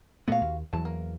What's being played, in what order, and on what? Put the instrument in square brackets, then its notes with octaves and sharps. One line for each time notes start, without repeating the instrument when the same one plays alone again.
[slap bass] A#2 A3 B3 [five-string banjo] F#4 F5
[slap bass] D#2
[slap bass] E2 E3 F#3 [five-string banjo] A5
[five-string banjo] A#3